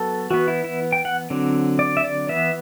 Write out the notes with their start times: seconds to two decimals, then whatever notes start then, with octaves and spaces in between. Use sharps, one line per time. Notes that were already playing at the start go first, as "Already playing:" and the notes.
Already playing: F#3 B3 A4
0.31 E3 B3 F#4
0.48 E4
0.64 E4
0.92 G5
1.05 F#5
1.30 D3 F#3 C4
1.79 D5
1.97 E5
2.04 D5
2.29 E3 B3 E5